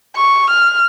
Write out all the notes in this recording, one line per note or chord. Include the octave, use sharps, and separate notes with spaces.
C#6
F6